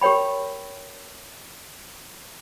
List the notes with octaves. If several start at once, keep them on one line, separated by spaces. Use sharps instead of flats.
G4 A#4 C#5 G5 B5